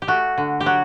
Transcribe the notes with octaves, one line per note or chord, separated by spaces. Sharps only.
G4
A3 F#4
D3
G4
F#3 F#4